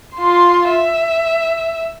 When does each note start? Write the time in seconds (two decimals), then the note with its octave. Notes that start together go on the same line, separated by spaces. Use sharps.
0.16 F4 C6
0.71 E5